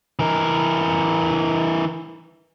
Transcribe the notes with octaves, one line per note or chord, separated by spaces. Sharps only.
E3 A#4